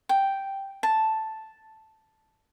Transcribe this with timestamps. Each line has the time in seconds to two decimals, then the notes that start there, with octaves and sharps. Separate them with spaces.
0.09 G5
0.83 A5